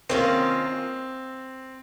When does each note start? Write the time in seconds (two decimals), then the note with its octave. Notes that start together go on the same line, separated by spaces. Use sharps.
0.09 D#3 A#3 C4 C#4 F4